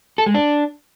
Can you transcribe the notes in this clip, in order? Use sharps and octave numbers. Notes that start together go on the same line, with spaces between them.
A4
G#3
D4